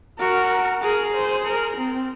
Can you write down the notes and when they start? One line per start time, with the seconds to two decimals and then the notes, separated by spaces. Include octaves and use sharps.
0.19 F#4 A#4
0.82 G#4 A#4
1.14 C5
1.46 A#4
1.77 C4